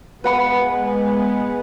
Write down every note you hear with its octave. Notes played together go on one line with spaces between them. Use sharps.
G#3 B3 B4 F#5 B5